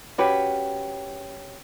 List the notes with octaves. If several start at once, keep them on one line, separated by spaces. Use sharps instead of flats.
C#4 F#4 G4 B4